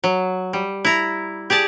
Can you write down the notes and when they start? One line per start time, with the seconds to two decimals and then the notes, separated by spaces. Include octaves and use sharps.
0.04 F#3
0.53 G3
0.85 E4 A#5
1.50 G4 G#4 D5 A5